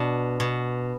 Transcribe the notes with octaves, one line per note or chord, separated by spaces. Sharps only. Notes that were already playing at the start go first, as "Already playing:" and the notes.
Already playing: B2 D4
B2